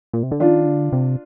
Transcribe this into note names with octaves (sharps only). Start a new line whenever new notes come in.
A#2
C3
D3
D#3 D4 F4
D3
C3